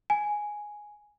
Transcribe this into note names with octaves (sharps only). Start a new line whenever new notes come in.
G#5